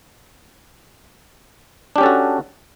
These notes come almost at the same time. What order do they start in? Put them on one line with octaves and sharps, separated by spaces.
D4 G4 C#4 A4 F#4